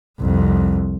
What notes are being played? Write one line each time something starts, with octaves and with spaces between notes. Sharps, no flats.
C2 F2